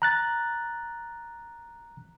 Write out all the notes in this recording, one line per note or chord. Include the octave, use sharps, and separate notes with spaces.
A#5 F#6 A6